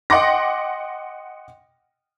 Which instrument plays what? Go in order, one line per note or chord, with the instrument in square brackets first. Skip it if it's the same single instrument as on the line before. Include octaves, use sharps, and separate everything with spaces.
[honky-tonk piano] D#5 F#5 G5 C6 D6 A#6